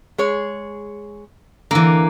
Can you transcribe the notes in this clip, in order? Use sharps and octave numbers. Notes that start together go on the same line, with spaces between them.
G#3 G#4 C#5
D3 E3 A#3